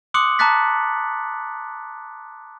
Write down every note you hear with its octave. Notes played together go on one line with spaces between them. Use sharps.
C6 D6 D#6 F#6 C#7 F#7
A5 A#5 D6 F#6 A6 B6